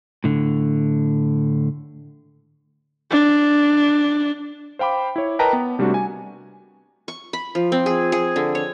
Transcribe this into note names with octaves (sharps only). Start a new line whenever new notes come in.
A2 D3
D4
C5 F5 G5 B5 D6
E4 C#5
A#4 B4 D#5 G5 A5 A#5
B3
C3 G3 A3 D4 F#4
G#5
C#6
B5
F3
C4
G#4
G#4
D3
C#5